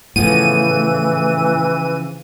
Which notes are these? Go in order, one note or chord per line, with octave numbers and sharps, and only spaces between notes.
A2 C#3 E3 F3 B3 D#7